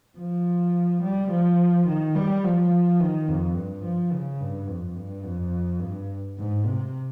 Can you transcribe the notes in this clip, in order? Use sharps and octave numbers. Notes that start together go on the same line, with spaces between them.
F3
G3
F3
D#3
G3
F3
D#3
F2
G2
F3
C#3
G2
F2
G2
F2
G2
G#2
C3